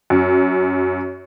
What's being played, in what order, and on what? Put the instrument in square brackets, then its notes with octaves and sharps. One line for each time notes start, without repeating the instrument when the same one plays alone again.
[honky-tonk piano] F#2